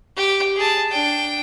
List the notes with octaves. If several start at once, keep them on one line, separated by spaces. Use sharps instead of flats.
G4
G#4 A5
D4 G5